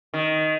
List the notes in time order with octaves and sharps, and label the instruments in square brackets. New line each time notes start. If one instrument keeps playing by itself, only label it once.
[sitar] D#3